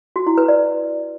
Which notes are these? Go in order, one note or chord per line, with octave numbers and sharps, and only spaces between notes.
F#4
E4
B4
D5